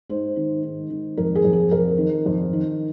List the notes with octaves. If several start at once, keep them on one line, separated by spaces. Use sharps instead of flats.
G#2 C5
D#3
G#2
D#3
F2 A#4
G#4
F2
G#4
F2 A#4
D#3
F2
D#3